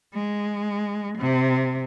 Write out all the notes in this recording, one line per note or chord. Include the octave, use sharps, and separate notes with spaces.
G#3
C3